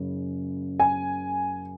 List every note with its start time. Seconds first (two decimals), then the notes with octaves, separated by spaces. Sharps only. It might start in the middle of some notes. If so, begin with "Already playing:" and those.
Already playing: F#1 C#3
0.80 G#5